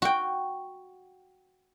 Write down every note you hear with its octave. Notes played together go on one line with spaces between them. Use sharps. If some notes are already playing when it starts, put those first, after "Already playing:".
F#4 G5